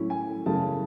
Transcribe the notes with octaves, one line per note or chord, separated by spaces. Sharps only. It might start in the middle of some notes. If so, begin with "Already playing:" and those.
Already playing: A2 F#3 C#4 E4
G#5
F#2 C#3 E3 A3 A5